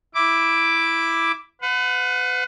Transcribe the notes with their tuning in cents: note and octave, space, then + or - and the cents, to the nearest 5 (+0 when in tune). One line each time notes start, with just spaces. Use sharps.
E4 +0 D6 +0
B4 +35 F#5 -30